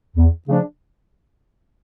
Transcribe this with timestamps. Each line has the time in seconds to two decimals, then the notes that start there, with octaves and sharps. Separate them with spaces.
0.17 E2
0.48 C#3 F3 A3 D4